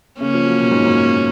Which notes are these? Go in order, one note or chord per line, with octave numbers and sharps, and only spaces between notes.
C#3 A#3 C#4
F3
F#3
B2
G#2
F#2